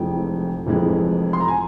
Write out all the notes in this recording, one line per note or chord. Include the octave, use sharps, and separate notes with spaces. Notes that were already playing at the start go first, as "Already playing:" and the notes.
Already playing: F1 F2 E3 G#3 G5
F1 F2 E3 G#3
C6
A#5
G#5